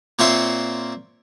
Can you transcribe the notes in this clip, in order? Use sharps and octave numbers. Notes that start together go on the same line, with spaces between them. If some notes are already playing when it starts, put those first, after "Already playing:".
A#2 C4 F4 C#5 E5 C6